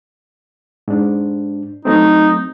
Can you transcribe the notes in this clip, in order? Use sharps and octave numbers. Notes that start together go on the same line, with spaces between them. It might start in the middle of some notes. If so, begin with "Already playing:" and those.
G#2 D4
F#3 A3 C4 D#4